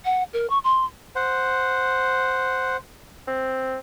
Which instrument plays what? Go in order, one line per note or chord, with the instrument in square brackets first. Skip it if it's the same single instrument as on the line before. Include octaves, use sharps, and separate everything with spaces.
[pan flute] F#5
A#4
C#6
C6
[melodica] C5 F#5
[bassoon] C4